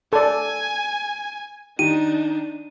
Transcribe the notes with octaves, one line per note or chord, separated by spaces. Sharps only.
A4 D5 G#5
D#3 D4 D#4 D#7